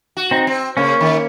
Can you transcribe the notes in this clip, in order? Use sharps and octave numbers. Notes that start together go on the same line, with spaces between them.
F#4
C4 D#4
C4
C#3 A#3 C#4
D#3